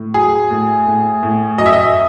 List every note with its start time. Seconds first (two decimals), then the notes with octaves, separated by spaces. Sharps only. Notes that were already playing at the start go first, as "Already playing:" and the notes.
Already playing: A2
0.14 F#3 G#4
0.51 A2
0.87 A2
1.23 A2
1.58 F#2 D#5
1.66 E5
1.73 D#5